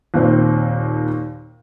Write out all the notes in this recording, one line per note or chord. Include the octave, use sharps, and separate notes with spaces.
D#2 A#2 C4